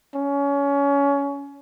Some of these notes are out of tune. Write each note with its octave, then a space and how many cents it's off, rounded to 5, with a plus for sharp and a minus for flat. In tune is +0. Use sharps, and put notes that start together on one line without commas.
C#4 +25